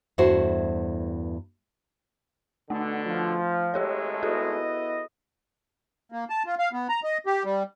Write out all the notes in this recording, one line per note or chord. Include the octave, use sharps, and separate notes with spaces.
E2 G2 A3 E4 F#4 C5
B2 D3 A3
F3
G#1 G#3 A3 G4 A4 C#5
B3 E4 F#4 G#4 A4 D#5
A#3
A5
F4
F5
B3
A#5
D#5
G4
G3